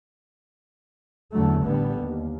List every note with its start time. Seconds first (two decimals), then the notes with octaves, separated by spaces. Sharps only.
1.33 E2 D3 F#3 A3
1.64 A1 D3 G3 B3
1.95 D#2